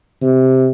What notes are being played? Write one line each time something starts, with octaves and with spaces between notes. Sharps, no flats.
C3